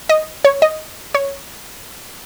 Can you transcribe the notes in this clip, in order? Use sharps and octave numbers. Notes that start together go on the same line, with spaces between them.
D#5
C#5
D#5
C#5